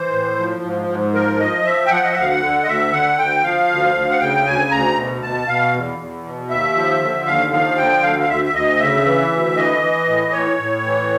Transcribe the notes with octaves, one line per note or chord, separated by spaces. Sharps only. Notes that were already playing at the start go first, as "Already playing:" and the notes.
Already playing: E3 C5
A2
F3
G#2
G#2
F3 A#4
F3 D#5
F3 E5
G5
F3 F#5
D#5
E5
D2 F5
F#5
D3
D#5
D2 E5
D3 F#5
D2 G5
F3 F5
D2
D2
F#5
C#3 G5
D2 G#5
D2 A#5
B2
B2 A5
B2 F5
E2
E2
B2
D#2 E5
F3
D3
D#2 F5
F3 F5
D3 G5
D2 F5
F5
D2 E5
E5
D2 D#5
C#3 E5
E3
D2
E3 D#5
E3
A2
A2 C#5
A2
E3